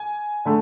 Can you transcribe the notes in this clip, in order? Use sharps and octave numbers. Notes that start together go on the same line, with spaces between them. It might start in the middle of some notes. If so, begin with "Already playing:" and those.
Already playing: G#5
D3 A3